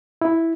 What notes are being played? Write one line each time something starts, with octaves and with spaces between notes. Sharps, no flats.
E4